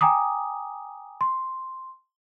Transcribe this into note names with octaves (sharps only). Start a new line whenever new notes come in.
G5 G#5 A#5 D6 D#6
C6